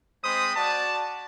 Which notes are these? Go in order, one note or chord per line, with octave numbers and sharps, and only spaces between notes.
G#3 C4 C5 B5 D#6
F#4 D5 A5